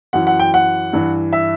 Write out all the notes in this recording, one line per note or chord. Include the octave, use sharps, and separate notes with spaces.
F#2 E3 F#5
F#5
G5
F#5
G2 E3
E5